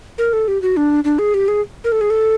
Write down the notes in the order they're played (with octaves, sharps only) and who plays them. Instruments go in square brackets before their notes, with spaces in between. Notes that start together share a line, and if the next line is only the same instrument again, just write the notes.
[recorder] A#4
A4
G4
F#4
D4
D4
G#4
G4
G#4
A#4
A4
G#4
A4